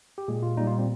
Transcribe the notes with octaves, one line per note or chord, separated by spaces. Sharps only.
G4
A#2 G#3 G#4
F4
A#2 G3 D#4
F4
C4